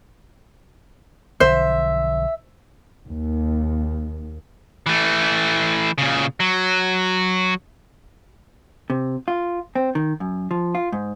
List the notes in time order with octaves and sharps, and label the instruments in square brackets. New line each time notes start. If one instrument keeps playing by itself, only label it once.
[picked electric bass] B1 D3 F3 [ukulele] C5 [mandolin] E5
[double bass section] D#2
[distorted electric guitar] E3 A3
A#2 C#3
F#3
[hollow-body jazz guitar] C3
F4
C4
D#3
F#2
F3
F4
G#2